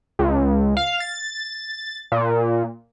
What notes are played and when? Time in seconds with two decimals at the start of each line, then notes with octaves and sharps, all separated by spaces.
0.19 C#2
0.77 F5
1.00 A6
2.12 A#2